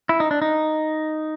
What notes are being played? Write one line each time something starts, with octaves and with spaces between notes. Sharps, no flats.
E4
D#4
D4
D#4